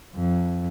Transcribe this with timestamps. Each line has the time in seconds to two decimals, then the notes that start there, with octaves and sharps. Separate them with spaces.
0.15 F2